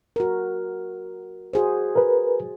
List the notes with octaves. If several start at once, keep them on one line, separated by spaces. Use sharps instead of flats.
F#4 A#4
F#4 G#4 C5
A#4 B4